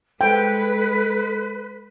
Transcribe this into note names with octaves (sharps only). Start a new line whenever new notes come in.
G#3 A4 B4 G5